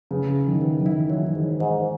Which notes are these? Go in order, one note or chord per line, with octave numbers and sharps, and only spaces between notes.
C#3 B3
E4
D#3
B3
D#3
E3 E4
E3 F#3
D#3
G#2
G#2